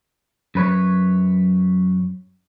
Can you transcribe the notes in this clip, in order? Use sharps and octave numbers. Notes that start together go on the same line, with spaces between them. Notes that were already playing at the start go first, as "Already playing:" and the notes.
F#2 B4 C#5